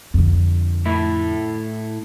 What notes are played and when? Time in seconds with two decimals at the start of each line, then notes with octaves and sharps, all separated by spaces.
0.14 F2 D3
0.86 A2 E4